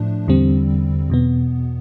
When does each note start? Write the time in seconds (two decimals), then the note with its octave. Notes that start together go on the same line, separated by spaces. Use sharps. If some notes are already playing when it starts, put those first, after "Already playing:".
Already playing: A2 F3 A3 D4
0.28 E2 D3 G3 C4
1.10 E2 B2 B3